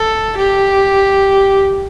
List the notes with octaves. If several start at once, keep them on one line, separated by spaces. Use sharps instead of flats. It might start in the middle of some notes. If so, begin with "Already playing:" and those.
Already playing: A4
G4